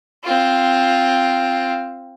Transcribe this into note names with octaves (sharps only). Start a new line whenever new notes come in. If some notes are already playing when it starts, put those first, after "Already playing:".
C4 F4